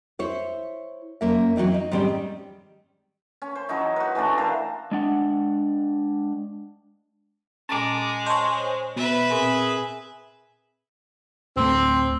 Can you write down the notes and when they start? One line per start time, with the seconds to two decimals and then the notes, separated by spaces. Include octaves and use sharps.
0.19 E4 C5 C#5
1.21 F#2 A#3 E5
1.56 E3 F#3 G3 C4 D#4
1.74 D#4
1.92 G#2 D#3 G3 C4 C#4
3.42 C#4
3.55 C5
3.69 F#3 C#4 D#4 E4
3.96 F#4 B4
4.15 E3 A3 C#4 D4
4.37 A4 A#4 C5 F5
4.91 G#3 D4 F#5
7.69 A#2 G#3 C#4 A5 A#5 D6
8.26 C5 C#5 D#5 A5
8.96 B2 B4 E5
9.31 A#2 C4 G#4 A#4
11.57 D1 A3 C4